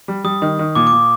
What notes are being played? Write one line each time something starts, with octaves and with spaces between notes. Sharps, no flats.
G3
G3 D#6
D#3
D#3
A#2 D6
D6
A#2